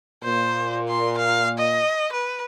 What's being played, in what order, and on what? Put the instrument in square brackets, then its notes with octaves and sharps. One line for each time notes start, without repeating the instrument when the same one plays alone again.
[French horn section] A#2 [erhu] C5
[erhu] C6
F5
D#5
B4